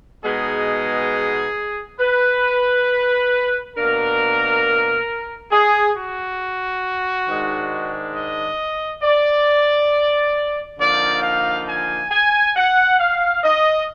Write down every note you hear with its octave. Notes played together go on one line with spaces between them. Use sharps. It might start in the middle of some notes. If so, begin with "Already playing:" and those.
B2 G#3 B3 D#4 G#4
B4
B2 A#3 D4 A#4
G#4
F#4
G#2 D#3 G#3 D4
D#5
D5
D3 F3 A#3 D#4 D5
F5
G#5
G#5
F#5
F5
D#5